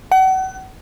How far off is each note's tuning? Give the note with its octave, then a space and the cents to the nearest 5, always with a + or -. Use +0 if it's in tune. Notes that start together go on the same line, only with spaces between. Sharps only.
F#5 +35